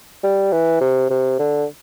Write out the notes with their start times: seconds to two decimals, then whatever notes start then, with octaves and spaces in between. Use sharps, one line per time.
0.23 G3
0.52 E3
0.81 C3
1.10 C3
1.39 D3